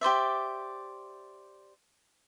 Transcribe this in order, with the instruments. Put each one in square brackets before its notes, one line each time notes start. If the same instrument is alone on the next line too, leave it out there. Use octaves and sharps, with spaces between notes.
[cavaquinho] G4 C5 D5 E5